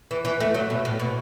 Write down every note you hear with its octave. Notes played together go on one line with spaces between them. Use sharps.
E3
E3
A3
F#3
B2
A2
B2